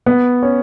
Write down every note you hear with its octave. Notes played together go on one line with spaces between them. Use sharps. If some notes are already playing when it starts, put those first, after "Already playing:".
B3
C#4